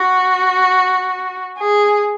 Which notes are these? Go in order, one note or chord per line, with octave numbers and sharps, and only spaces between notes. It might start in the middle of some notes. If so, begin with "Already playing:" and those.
Already playing: F#4
G#4